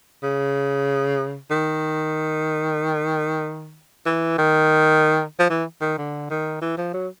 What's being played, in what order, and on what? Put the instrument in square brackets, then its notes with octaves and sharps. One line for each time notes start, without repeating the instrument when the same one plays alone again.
[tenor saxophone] C#3
D#3
E3
D#3
F3
E3
D#3
D3
D#3
E3
F3
F#3